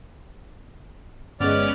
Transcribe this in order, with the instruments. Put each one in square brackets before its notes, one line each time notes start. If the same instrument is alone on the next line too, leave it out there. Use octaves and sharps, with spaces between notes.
[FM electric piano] G1 G#3 [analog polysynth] B3 C#4 F#6 [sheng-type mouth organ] D5 F6